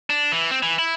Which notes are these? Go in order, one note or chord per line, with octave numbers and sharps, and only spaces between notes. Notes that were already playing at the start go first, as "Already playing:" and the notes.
D4
E3
C4
E3
E4